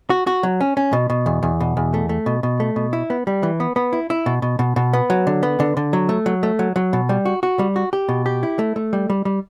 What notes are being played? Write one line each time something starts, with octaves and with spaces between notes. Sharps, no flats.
F#4
F#4
F#3
C#4
C#4
B2
B2
E2
E2
B2
E2
A3
A3
B2
B2
A3
B2
E4
B3
G3
E3
B3
B3
E4
E4
B2
B2
B2
B2
B3
F#3
D3
B3
D3
D3
F#3
A3
F#3
A3
F#3
F#3
B2
G3
F#4
F#4
G3
F#4
G4
B2
G4
E4
A3
A3
G3
G3
G3